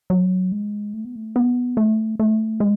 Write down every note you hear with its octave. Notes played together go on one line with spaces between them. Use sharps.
F#3
G#3
A3
B3
A3
B3
A3
A3
G#3